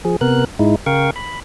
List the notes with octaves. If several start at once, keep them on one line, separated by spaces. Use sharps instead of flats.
F3 G#4
C3 B3 A#4 F#6
G#2 G#3 D#4 E4
C#3 A#4 F5 G5 C#6
B5